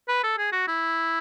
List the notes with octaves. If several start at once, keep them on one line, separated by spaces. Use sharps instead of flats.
B4
A4
G#4
F#4
E4